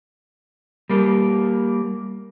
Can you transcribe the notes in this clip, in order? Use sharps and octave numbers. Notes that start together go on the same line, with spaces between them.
G3 A#3